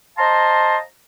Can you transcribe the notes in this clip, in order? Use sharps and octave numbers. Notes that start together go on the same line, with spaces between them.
C5 D#5 F5 A5 A#5 C6